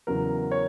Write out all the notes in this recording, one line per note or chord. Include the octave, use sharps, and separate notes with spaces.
E2 C#3 F#3 A#4
C#5